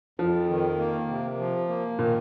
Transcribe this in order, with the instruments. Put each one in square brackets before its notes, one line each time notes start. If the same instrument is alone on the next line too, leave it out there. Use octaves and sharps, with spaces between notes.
[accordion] F2 [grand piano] F3
[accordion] D#3
A#3
C3
F3
A#3
[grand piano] A#2 [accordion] D#3